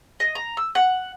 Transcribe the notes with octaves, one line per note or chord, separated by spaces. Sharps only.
D#5
A#5
E6
F#5